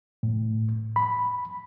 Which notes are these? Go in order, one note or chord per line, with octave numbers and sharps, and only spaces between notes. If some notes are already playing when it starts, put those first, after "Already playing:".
A2
B5